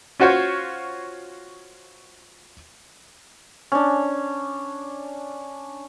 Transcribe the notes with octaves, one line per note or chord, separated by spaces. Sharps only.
C#4 F4 F#4 C5 C#5
C#4 D4